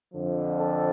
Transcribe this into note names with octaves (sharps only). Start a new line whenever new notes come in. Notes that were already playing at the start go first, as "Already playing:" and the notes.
F2 D3 F3
A4